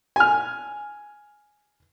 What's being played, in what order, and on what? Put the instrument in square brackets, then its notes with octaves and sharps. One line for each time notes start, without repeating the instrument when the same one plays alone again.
[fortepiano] G#5 F6